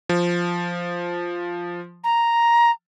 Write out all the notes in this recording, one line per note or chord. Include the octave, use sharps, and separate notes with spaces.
F3
A#5